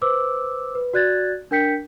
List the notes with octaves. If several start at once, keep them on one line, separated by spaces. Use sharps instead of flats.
B4 C5 D6 E6
B4
F#4 D5 F#6 G#6 A6
D4 A#4 G5 G6 B6 C#7